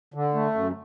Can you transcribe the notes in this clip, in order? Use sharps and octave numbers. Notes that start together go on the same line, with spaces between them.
D3
A3
F#2